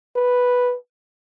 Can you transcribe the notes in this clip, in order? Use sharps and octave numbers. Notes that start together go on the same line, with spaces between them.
B4